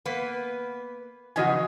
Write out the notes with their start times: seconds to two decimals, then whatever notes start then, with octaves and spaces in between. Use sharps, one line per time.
0.05 A#3 B3 B4
1.36 C#3 E3 F3 F#4 D#5 G#5